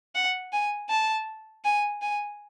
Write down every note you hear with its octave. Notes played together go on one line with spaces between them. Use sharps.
F#5
G#5
A5
G#5
G#5